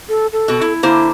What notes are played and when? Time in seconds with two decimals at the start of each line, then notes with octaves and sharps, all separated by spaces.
0.09 A4
0.33 A4
0.48 B2 F#4
0.61 E4
0.83 D3 A#3 E4 C5